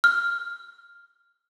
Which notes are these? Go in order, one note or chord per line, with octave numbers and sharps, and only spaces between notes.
F6